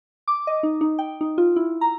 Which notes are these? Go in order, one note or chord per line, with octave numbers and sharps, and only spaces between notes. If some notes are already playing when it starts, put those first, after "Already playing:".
D6
D#5
D#4
D#4
G5
D#4
F4
E4
A#5